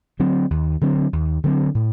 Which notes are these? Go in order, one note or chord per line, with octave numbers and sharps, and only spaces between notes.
D3 F#3 C4
D#2
D3 F#3 C4
D#2
D3 F#3 C4
A2